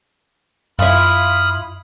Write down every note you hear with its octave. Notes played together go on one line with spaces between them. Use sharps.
F#2 E4 F4 B5 D#6 F6